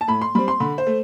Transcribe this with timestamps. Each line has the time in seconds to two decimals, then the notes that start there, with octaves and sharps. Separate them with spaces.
0.01 A5
0.08 A2 B5
0.22 C6
0.35 G3 C4 B5
0.48 C6
0.60 D3 B5
0.78 C5
0.87 A3